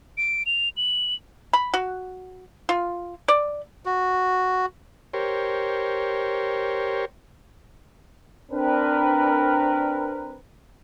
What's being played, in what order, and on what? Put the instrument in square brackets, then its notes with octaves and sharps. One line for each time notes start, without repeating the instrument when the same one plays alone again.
[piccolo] D7
F7
F#7
[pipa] B5
F#4
F4
D5
[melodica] F#4
[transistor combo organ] G4 A#4 C5 C#5
[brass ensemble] C4 D4 A#4 B4